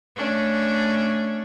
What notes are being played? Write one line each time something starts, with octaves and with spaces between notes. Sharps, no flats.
A3 C#4 D4